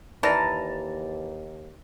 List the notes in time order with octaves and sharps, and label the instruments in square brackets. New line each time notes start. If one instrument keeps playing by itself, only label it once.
[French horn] D#2 [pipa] E3 [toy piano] D#4 B4 D5 [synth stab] A5 A#5